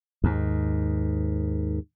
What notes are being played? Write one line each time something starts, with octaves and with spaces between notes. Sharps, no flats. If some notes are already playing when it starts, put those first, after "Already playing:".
D#2 G#2